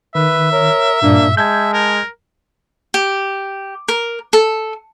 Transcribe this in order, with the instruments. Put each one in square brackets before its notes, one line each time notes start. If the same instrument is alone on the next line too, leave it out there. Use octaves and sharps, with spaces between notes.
[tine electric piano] D#3 [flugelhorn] B4 [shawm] E5
[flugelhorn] A#4 [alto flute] C#5
[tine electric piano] G2 A#2 [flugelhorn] A#3 [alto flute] D4
[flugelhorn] G#3 [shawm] E5 [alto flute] A5 [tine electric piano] G6 G#6
[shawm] A#4
[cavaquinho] G4
A#4
A4